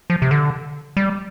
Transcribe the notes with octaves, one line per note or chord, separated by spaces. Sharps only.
F3
C3
D3
G3